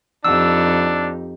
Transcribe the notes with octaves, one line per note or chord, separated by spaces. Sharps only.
F2 D4 D#4 G4 E6